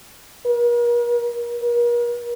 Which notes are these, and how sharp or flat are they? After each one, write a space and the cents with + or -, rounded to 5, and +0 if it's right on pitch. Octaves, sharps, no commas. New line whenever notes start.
A#4 +40
A#4 +40